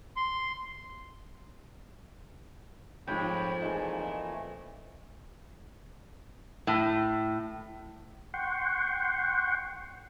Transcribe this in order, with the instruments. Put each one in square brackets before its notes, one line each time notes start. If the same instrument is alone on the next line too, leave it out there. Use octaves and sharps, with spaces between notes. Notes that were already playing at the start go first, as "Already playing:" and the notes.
[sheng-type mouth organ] C6
[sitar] F2 [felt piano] G#2 F3 G6 [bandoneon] C#5 G5 B5
[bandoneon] A#2 E3 A3 [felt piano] D#4 G#4 G#5
[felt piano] D#5
[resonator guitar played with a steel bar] A2
[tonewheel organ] F#5 G5 C6 C#6